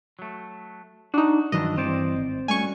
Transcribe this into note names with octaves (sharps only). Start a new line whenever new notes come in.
F#3 A3
D4 D#4 F#4
G2 D#3 E3 F#3 D4 D#5
G2 E3 C4 C5 D5
G#1
G3 A3 C#4 F#4 G#5 C#6